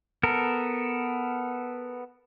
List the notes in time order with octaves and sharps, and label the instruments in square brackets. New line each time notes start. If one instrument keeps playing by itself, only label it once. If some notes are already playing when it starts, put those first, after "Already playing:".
[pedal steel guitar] B3 A4 A#4